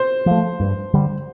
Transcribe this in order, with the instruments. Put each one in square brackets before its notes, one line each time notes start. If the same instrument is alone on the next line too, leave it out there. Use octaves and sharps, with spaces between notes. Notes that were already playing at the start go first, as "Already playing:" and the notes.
Already playing: [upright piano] C5
[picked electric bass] F3 A3
G2
D3 G3